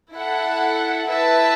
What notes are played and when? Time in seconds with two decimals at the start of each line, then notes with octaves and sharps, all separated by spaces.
0.14 E4 A4 F#5
1.08 E4 B4 E5 A5